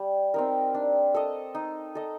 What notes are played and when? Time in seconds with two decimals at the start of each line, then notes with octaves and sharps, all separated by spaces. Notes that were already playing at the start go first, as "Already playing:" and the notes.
Already playing: G3
0.34 C4 D#4 A#4
0.74 D4
1.14 A4 D#5
1.55 D#4
1.95 A4 D#5